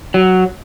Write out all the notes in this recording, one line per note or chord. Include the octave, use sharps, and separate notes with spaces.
F#3